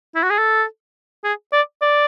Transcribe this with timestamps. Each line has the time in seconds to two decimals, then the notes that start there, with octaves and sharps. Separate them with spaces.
0.15 E4
0.23 F#4
0.30 G#4
0.38 A4
1.24 G#4
1.53 D5
1.82 D5